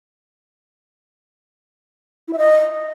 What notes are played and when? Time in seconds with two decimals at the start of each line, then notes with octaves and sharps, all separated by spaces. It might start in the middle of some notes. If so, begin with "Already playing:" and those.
2.28 E4
2.33 E5
2.38 D#5